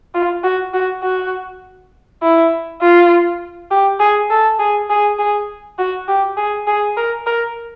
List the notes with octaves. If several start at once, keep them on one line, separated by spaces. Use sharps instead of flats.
F4
F#4
F#4
F#4
E4
F4
G4
G#4
A4
G#4
G#4
G#4
F#4
G4
G#4
G#4
A#4
A#4